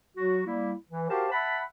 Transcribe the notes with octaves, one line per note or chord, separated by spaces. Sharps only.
F#3 F#4
G3 A#3 E4
E3
F#4 G4 A#4 C5 F5 A5
E5 F#5 A5 B5